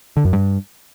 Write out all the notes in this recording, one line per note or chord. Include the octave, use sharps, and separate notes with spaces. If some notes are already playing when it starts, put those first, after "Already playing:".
D3
F#2
G2